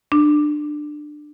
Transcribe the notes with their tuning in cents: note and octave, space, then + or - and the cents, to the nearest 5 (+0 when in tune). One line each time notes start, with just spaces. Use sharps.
D4 +20